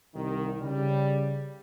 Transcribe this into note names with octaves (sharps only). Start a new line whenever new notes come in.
C2 D#3
C#3 G3